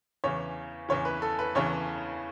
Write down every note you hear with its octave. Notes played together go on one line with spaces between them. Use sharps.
E2 C#3 E3 C#5
E2 C#3 E3 C#5
B4
A4
B4
E2 C#3 E3 C#5